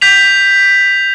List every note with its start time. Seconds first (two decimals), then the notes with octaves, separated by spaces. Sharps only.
0.02 G6 B6 F7